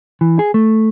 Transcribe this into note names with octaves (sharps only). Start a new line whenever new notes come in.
E3
G#4
A3